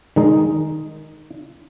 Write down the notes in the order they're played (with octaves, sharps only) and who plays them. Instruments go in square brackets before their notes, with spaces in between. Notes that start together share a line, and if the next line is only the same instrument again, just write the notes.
[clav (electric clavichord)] D#3 G#3 D#4